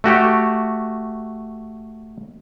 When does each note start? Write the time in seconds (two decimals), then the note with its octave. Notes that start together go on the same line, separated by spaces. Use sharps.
0.04 A3 F#4 G4